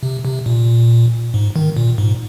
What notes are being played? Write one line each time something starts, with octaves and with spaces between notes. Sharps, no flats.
C3
C3
A#2
G#2
D#3
A#2
G#2